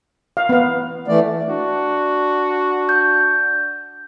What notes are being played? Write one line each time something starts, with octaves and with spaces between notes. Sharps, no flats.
F5
B3 F5
E3 A3 D5
D4 F#4
G6